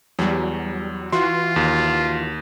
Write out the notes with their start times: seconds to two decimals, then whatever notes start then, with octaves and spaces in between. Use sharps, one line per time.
0.19 E2 F#3 G3
1.12 E3 F4 F#4 C6
1.56 D#2